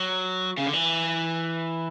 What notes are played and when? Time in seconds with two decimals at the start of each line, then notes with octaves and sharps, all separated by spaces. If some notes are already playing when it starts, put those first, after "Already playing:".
Already playing: F#3
0.58 C#3
0.66 D3
0.73 E3